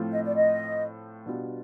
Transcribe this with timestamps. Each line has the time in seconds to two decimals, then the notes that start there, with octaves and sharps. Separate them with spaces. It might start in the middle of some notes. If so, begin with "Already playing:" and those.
Already playing: A2 F3 A3 C4 F4
0.12 D#5
0.25 D5
0.35 D#5
1.26 B2 G3 B3 D4 F4